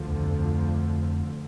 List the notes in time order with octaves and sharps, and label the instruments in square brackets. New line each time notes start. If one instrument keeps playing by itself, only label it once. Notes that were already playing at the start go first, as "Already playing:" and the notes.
Already playing: [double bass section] D2 D3 F3
[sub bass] E2
F2
F2